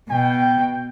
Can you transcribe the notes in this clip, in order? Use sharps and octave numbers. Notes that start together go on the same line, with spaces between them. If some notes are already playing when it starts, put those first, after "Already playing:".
B2 G5